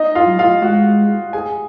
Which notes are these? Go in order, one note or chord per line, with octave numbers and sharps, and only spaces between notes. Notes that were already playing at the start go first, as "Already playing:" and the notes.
Already playing: D#4 D#5
F4 F5
F#3
F4 F5
G#3 F#4 F#5
G#4 G#5